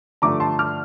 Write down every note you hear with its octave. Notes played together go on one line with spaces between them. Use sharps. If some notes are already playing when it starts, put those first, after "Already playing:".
G2 D3 F3 A3 A#5 D6
A5 C6
D6 F6